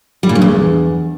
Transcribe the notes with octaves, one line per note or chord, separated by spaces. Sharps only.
G3
A#2
G2
E2